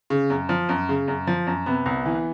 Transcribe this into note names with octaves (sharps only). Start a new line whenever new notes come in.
C#3
F#2
F3
F#2
C#3
F#2
F3
F#2
C3 B3
C2
E3